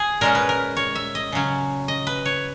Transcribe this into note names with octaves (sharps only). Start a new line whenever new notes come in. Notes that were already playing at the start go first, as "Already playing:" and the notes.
Already playing: G#4
A#2 G#3 C#4 A#4
B4
A#4
C#5
E5
D#5
C#3 F#3 C#4
D#5
B4
C#5